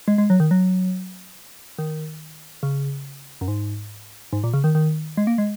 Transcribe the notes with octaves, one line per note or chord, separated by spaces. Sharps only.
G#3
G#3
F#3
D#3
F#3
D#3
C#3
F#2
G#2
G#2
A#2
C#3
D#3
D#3
G#3
A#3
G#3